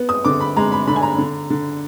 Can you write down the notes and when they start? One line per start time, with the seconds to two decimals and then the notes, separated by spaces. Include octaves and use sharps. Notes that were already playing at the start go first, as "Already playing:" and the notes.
Already playing: B3
0.09 D#6
0.24 D3 D6
0.40 B5
0.56 G#3 A#5
0.72 B5
0.87 D3 B5
0.96 G#5
1.03 A#5
1.18 D3
1.50 D3